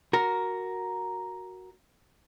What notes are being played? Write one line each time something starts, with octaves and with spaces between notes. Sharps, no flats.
F#4 A#4